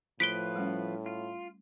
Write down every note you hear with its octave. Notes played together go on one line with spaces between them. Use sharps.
A2 F3 F4 B4 B6 D7 G7
G3 A3 C#4
F4